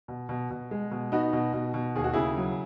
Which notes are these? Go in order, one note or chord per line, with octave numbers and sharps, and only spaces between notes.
B2
B2
B2
G#3
B2
B3 D#4 F#4
B2
B2
B2
D#2 G#4
F#4
C#3 E4 G#4
F#3